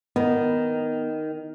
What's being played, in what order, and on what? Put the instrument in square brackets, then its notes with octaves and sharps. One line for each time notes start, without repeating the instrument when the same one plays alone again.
[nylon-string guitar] D#3 [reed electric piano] B3